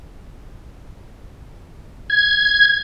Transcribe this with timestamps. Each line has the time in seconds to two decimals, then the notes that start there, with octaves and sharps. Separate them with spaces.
2.10 G#6